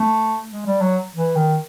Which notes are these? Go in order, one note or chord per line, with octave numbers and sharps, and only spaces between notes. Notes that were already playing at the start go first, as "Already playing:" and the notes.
Already playing: A3
G#3
G3
F#3
E3
D#3